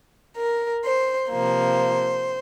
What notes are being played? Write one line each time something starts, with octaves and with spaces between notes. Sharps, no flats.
A#4
C5
C3 F3 A#3 C5